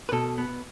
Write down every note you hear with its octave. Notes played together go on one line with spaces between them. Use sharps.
B4
B2 A4
B3